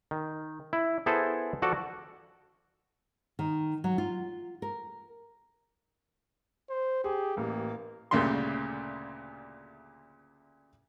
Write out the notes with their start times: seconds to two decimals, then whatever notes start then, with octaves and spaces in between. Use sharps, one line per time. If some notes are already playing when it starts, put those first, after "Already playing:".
0.11 D#3
0.73 E4
1.06 B3 E4 G#4 A4 C5
1.62 F3 F#4 A4 D5
3.39 D#3
3.84 F#3
3.98 F4
4.62 A#4
6.70 C5
7.04 G4 G#4
7.37 A1 A#3
8.11 D2 A#2 C#3 G3 A3 C6